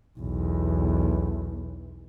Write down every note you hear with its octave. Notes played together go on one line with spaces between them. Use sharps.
B1 E2